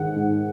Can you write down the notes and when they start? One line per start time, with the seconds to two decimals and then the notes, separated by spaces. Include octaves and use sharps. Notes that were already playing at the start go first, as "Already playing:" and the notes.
Already playing: G#2 D#3 F#5
0.16 G#2